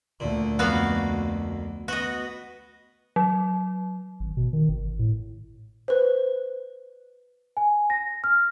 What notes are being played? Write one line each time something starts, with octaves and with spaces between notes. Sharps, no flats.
D2 A#2
F2 A#3 B3 F#4 F5
B3 F#4 D#5
F#3
G#1
B2
D#3
G#1
A2
B4 C5
G#5
A#6
F6